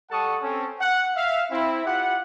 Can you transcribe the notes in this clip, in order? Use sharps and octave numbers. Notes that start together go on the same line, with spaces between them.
G3 A4 F#5 A5 C#6 D#6
C4 C#4 A4
F#5
E5 F5
C4 E4
E4 F4 G4 F#5